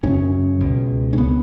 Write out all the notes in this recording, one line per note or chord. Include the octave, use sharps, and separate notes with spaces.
F#2 C#3 C#4
C#2 B2
C#4
C#3 B3